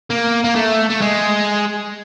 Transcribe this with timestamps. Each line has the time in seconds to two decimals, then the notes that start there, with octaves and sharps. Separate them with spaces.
0.10 A#3
0.44 A#3
0.55 A3
0.89 A3
1.01 G#3